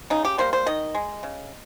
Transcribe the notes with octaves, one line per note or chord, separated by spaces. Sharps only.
C#3 D#4
G4
G3 A#3 C5
C5
D#3 D#5
G#3
C#3